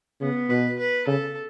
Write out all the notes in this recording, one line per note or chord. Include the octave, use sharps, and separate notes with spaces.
C#3 B3
B2 B4
B4
C#3 A4